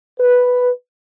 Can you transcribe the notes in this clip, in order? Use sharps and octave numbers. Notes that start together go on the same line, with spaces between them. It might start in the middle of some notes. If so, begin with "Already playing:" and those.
B4